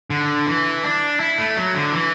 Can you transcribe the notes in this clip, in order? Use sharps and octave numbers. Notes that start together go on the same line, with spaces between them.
D3
E3
D4
E4
A3
F#3
D3
E3